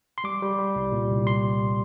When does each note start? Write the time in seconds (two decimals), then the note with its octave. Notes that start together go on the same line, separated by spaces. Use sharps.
0.18 C6
0.24 G3 D6
0.42 G3
0.59 G3
0.76 C2
0.92 A#2
1.10 C2
1.27 C6